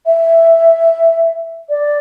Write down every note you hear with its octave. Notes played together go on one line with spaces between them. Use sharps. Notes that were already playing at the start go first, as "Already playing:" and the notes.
E5
D5